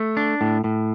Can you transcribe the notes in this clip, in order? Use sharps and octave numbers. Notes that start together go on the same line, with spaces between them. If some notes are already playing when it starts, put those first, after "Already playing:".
Already playing: A3
D4
A2
A2